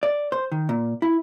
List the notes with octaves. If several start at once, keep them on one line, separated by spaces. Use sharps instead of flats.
D5
C5
D#3
A#2
E4